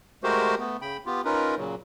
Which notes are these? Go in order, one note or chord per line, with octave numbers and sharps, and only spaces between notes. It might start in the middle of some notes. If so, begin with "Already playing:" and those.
G#3 A3 F#4 G4 A#4 C5
A3 B3
C#3 G5 B5
B3 F4 G4
C#4 D#4 F4 A#4 B4
A#2 C#3 F#3